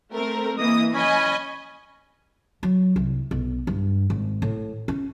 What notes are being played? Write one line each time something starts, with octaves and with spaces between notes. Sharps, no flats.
A3 C4 A#4
E3 A#3 D#5 D#6
C#4 D#5 G#5 B5
F#3
C2
B1
G2
G#1
A2
C#4